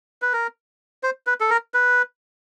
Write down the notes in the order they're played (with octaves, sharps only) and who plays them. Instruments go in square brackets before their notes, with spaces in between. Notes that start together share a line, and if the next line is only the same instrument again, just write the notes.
[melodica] B4
A#4
C5
B4
A4
A#4
B4